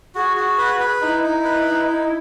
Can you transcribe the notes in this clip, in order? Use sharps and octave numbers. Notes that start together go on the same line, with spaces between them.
F#4 G#4
F#4
B4
B4
D#4 E4
D#4
B4
D#4
D#4